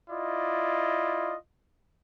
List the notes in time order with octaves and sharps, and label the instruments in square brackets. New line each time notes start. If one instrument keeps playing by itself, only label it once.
[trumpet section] E4 F4 D5 D#5